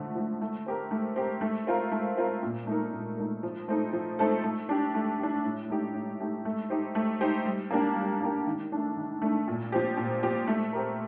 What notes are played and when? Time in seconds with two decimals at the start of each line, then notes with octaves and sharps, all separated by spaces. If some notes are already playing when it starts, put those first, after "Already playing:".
Already playing: D3 F3 A3
0.15 F3 A3
0.41 A3
0.66 C4 G4 A#4
0.91 A3
1.16 C4 G4 A#4
1.41 A3
1.67 C4 F4 A#4
1.92 A3
2.17 C4 F4 A#4
2.43 A#2
2.67 A3 D#4 A#4
2.93 A#2
3.17 A3 D#4 A#4
3.43 F3
3.68 A3 C4 D#4 A4
3.93 F3
4.19 A3 C4 D#4 A4
4.44 A3
4.69 D4 G4
4.94 A3
5.19 D4 G4
5.45 A2
5.70 A3 D#4 G4
5.94 A2
6.20 A3 D#4 G4
6.45 A3
6.70 D#4 G4 C5
6.95 A3
7.21 D#4 G4 C5
7.46 G3
7.71 A#3 D4 G4 A#4
7.96 G3
8.21 A#3 D4 G4 A#4
8.47 D#3
8.72 A3 D4
8.97 D#3
9.22 A3 D4
9.48 A#2
9.72 F3 C4 G4
9.97 A#2
10.23 F3 C4 G4
10.47 A3
10.73 C4 G4 A#4